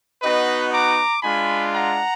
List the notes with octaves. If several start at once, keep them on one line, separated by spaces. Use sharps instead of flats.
B3 D#4 F#4 B4 D#5
A#5 D6
G#3 D4 F4 G#5 B5
F#5 A#5